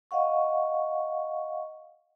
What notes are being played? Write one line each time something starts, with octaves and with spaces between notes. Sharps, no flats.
D#5 F5 F#5 C#6